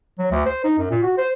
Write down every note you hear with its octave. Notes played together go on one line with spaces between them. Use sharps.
F#3
D2
C5
D#4
F#2
A#2
F#4
C5